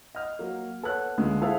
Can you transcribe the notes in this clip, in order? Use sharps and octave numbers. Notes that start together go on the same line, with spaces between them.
D#5 F6
F#3 A#3
B3 A4 C#5 F#6
C#2 D3 G#3 A3
E4 G#4 A4 C5 E5 F5